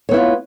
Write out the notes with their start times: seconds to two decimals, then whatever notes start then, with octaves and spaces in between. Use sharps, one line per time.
0.09 C#5
0.11 B3
0.14 E4
0.16 F4